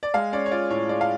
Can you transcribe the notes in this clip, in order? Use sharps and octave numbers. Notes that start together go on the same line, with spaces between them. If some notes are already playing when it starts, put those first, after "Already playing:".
D5
G#3 F5
C#4 D5
C#5
F4 D5
A2 C#5
G#3 D5
F5